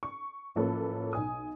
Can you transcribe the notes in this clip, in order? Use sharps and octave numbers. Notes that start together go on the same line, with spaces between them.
C#6
A1 F3 A#3 C#4 A4 B4
B1 G#5 D#6